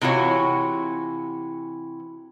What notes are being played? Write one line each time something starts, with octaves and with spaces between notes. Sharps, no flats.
C3 E3 F4 F#4 C#5